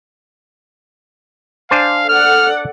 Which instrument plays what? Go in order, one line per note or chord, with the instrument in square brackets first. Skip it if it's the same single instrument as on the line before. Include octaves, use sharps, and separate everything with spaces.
[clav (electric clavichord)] D4 C5 G#5 [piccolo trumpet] F5
[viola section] A4 D5 F#5 [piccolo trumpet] F6